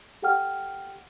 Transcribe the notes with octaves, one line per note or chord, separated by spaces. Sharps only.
G4 A4 F#5 G5 F6